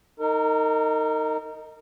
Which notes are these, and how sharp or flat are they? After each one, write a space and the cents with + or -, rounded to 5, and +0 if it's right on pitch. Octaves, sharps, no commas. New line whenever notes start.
D#4 +0 A#4 -35